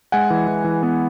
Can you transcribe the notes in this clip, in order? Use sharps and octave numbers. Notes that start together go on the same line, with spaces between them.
G#3 F#5 G#5
E3
E3
E3
B3